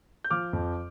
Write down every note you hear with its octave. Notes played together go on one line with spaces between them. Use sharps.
G6
F3 D6 F6
F2